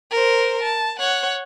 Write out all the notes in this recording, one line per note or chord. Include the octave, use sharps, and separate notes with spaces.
A#4 C5
A5
C#5 F#5